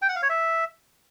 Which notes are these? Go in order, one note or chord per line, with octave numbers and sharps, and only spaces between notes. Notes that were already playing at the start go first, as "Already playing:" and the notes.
G5
F#5
F5
C#5
E5